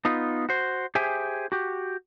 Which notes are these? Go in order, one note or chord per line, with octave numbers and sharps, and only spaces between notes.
B3 D#4 F4
F#4 C5
G4 G#4 C5 E5 G5 G#5
F#4 G4